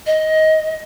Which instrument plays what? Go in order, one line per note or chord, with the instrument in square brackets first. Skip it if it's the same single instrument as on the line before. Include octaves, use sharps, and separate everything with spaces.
[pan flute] D#5